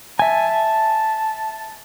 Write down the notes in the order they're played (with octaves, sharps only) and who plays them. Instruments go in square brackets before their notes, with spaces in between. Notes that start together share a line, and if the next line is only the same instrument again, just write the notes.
[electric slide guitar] E5 G#5 [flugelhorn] A5